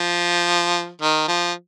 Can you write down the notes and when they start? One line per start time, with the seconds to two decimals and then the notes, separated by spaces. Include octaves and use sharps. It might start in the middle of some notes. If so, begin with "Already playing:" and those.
Already playing: F3
1.02 D#3
1.28 F3